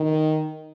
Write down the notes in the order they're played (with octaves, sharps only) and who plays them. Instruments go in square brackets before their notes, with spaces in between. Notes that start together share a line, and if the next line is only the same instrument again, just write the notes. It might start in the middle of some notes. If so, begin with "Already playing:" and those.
Already playing: [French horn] D#3